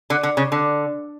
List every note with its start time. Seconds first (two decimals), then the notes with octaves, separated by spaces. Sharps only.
0.10 D3
0.23 D3
0.37 C#3
0.52 D3